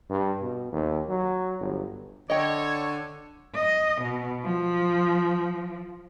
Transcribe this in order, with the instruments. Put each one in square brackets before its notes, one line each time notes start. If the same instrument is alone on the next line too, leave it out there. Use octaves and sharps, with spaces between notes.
[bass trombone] G2
B2
D#2
F#3
G1
[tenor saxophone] D3 [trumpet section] C#5 [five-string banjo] D#5 G5
[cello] D#5
B2
F3